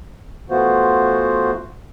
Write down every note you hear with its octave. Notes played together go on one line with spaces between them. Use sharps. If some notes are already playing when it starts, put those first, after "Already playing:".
E3 A3 B3 F4 F#4 C5